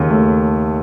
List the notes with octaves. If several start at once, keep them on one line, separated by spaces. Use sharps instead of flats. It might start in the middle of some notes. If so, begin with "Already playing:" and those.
Already playing: D#2 C#3
A3